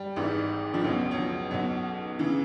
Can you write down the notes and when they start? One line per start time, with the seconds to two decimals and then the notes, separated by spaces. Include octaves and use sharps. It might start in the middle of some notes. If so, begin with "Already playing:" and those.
Already playing: G3
0.16 G#1 G#2 E3
0.74 F3
0.84 C#2 B2 F#3
1.11 F#3
1.18 F3
1.51 B1 B2 F#3
2.19 C#3 E3